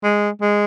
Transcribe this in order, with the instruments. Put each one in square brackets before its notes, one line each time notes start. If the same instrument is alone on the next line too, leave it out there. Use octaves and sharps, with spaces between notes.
[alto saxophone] G#3
G#3